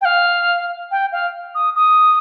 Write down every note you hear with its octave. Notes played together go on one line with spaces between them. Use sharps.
G5
F5
G5
F5
D#6
D#6